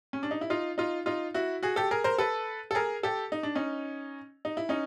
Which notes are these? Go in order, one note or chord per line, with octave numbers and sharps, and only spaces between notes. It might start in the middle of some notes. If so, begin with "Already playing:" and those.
C#4
D4
D#4
E4
D#4 F4
D#4 F4
D#4 F4
E4 F#4
F#4 G#4
G4 A4
G#4 A#4
A#4 C5
A4 B4
A4
G#4 A#4
G4 A4
D#4
D4
C#4 D#4
D#4
E4
C#4 D#4